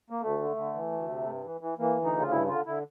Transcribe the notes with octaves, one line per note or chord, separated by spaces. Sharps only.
A#3
D2 A3
D3
D3
E3
D2
C3
G2
E3
E3
E3 A#3
D2
D#4
C#3
F4
G2 E4
D3 F4
D3 E4